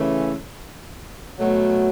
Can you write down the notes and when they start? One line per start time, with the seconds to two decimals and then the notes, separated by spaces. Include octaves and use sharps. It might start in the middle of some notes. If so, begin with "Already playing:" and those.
Already playing: C#3 E3 A3 C#4
1.39 B2 F#3 A3